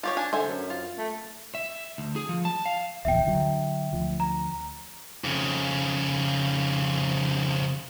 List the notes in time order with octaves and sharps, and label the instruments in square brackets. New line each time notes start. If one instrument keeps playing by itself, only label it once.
[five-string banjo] F4 G4 C#5
[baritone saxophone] D4 [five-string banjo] G#5
[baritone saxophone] D3 [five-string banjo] C5 E5 G#5
[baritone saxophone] F#2
[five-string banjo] F4
[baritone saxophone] A3
[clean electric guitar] E5
D2
G#4
F3
A5
F5
[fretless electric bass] D1 A#1 E2 [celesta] E5 G5
[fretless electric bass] D3 F#3
D2 F3
[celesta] A#5
[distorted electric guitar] F2 C#3